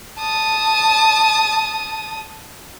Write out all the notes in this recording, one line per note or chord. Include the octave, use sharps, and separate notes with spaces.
A5 D#6